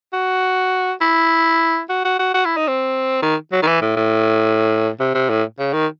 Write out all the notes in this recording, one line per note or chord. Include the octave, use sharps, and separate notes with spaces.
F#4
E4
F#4
F#4
F#4
F#4
E4
D#4
C4
D#3
F#3
D#3
E3
A2
A2
C3
C3
A2
C#3
D#3